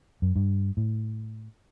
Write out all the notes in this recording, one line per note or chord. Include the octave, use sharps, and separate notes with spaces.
F#2
G2
A2